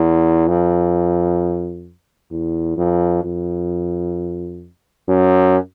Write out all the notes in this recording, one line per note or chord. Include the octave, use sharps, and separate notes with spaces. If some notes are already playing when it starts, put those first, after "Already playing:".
Already playing: E2
F2
E2
F2
F2
F#2